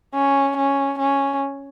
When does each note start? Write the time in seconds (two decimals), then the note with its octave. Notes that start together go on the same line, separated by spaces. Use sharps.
0.15 C#4
0.58 C#4
0.99 C#4